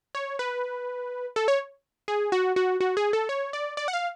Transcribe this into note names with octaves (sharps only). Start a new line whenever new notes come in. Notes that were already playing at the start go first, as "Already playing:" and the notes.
C#5
B4
A4
C#5
G#4
F#4
F#4
F#4
G#4
A4
C#5
D5
D5
F#5
F5